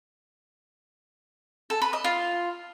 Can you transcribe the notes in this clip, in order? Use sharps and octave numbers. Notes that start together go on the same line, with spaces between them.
A4
B4
D#5
F4